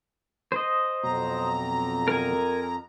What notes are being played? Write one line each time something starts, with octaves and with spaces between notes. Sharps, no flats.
C5 D#5
F2 B2 F#3 A#5
A#4 G#5